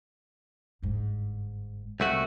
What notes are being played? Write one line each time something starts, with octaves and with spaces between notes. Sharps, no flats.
G1 G#2
C2 A3 F#4